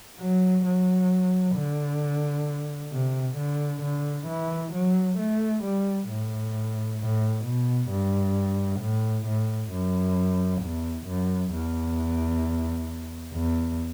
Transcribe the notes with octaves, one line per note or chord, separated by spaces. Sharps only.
F#3
F#3
D3
C3
D3
D3
E3
F#3
A3
G3
A2
A2
B2
G2
A2
A2
F#2
E2
F#2
E2
E2